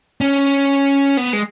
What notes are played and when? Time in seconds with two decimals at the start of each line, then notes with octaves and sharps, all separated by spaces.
0.21 C#4
1.17 B3
1.33 G#3